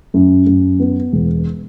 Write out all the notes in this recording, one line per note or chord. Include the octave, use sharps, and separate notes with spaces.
F#2
F#2
B3
E1